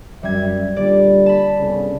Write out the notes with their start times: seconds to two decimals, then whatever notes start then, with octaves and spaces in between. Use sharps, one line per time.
0.23 F#2 G3 E5 G#6
0.76 A#2 D3 G3 D5
1.26 A5 B5
1.59 G1 C2 C#3